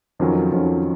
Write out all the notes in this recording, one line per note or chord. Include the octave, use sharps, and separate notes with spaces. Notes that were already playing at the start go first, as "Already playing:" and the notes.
F2 D#3 F#3 C#4 F4
F2 D#3 F#3 C#4 F4